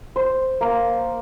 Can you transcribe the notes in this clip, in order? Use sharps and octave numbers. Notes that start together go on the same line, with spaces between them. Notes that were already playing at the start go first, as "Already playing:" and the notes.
C5
A#3